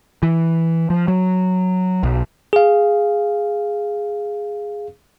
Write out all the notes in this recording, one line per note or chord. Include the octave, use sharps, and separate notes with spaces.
E3
F3
F#3
B1
G#4 F5